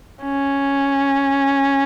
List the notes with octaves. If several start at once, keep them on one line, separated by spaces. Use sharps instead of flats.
C#4